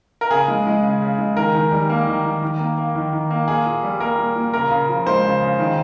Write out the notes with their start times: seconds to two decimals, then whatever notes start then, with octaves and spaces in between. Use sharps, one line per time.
0.21 A#4
0.30 C#3 G#4
0.48 G#3
0.67 G#3
0.83 C#3
1.02 C#3
1.19 G#3
1.37 D#3 A#4
1.55 D#3
1.72 G3
1.89 A#3
2.07 D#3
2.25 D#3
2.43 D#3
2.59 A#3
2.77 A#3
2.95 D#3
3.13 D#3
3.30 A#3
3.48 A#2 G#4
3.66 A#2
3.83 G3
4.00 A#3 A#4
4.18 A#2
4.36 A#2
4.53 C#3 A#4
4.71 C#3
4.89 F3
5.07 G#3 C5
5.24 C#3
5.42 C#3
5.60 D#3